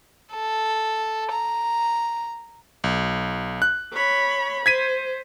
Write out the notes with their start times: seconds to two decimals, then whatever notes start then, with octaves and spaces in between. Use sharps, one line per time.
0.33 A4
1.32 A#5
2.84 B1
3.62 F#6
3.93 C#5 B5
4.66 C5 G#6 B6 D#7